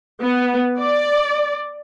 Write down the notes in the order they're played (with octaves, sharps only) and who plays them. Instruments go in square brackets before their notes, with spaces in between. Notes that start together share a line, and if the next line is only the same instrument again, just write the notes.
[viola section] B3
D5